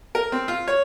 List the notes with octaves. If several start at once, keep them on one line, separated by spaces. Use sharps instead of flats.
A#4
C4
F4
C#5